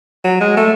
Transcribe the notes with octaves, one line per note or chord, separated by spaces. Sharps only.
F#3
G#3
A3